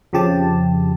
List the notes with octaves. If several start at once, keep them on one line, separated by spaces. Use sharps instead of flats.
F2 C#3 F3 G4 A5